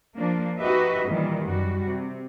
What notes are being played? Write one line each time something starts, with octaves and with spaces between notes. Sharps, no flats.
F3 A#3 D4
D#4 F#4 G4 B4 D#5 E5
A#2 D#3 E3 G3
F#2 G3 F#4
C3